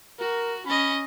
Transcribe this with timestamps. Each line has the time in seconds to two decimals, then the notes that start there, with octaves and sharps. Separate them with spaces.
0.19 F#4 A#4
0.66 C#4 D#5 B5